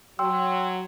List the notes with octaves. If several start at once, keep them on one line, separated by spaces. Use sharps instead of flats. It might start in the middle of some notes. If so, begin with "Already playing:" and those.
F#3 G5 C6 E6